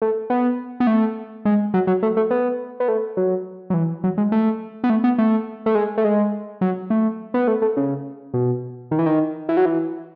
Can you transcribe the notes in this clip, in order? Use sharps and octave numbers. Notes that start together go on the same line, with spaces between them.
A3
B3
B3
A3
G#3
F#3
F#3
A3
A3
B3
B3
A3
F#3
F#3
E3
F#3
G#3
A3
B3
A3
B3
A3
A3
G#3
A3
G#3
F#3
A3
B3
A3
A3
C#3
B2
D#3
E3
D#3
E3
F#3
E3